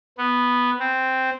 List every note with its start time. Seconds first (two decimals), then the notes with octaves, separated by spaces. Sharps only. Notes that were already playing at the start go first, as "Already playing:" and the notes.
0.18 B3
0.80 C4